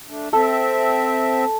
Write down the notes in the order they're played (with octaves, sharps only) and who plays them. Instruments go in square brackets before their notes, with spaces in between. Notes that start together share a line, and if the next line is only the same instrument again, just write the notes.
[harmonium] A3 D4
[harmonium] C4 E5 [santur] A4